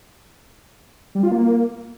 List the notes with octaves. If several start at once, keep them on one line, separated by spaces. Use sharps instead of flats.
G3
F4
A#3